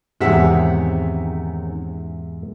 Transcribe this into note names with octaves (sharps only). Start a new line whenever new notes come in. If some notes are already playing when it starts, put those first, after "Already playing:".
E2 G#2 C3 D#3 C4 C#4 E5 F#5